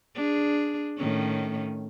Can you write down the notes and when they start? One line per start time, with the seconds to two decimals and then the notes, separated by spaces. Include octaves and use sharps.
0.15 D4 G#4
0.98 A2 D#3 C#4